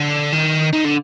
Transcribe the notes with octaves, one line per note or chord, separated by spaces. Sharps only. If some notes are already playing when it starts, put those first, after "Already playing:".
Already playing: D3
D#3
D#3
D3